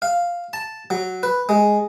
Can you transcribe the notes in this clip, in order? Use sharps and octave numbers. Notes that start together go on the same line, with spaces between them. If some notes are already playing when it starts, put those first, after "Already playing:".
F5
A5
F#3
B4
G#3